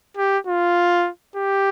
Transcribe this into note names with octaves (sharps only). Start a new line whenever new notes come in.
G4
F4
G4